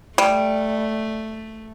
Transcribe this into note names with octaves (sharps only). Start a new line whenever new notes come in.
G3 A3